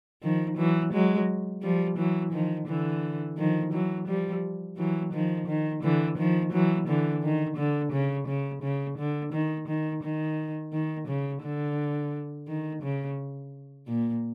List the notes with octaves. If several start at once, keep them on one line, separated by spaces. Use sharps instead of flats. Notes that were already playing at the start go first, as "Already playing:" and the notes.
D#3 F3
E3 F#3
F#3 G#3
F3 G3
E3 F#3
D#3 F3
D3 E3
D#3 F3
E3 F#3
F3 G3
E3 F#3
D#3 F3
D#3
D3 E3
D#3 F3
E3 F#3
D3 E3
D#3
D3
C#3
C#3
C#3
D3
D#3
D#3
D#3
D#3
C#3
D3
D#3
C#3
A#2